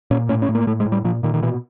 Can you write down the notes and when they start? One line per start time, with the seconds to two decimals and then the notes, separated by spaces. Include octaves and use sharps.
0.11 A#2 C#4
0.29 A2 C#4
0.42 C#4
0.49 A2
0.55 A#3
0.67 A2 A3
0.80 G#3
0.86 A2
0.92 G3
1.04 A#2 F3
1.23 A#2 D#3
1.34 D#3
1.42 B2 E3